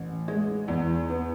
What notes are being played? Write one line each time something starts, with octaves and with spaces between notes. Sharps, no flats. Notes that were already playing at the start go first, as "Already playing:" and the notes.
Already playing: A1
G#3
E2
B3